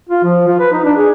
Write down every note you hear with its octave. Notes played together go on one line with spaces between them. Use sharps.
F4
F3
F4
B4
D#4
D4
G#4